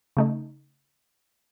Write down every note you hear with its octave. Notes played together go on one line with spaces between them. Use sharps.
C#3 A3 D#4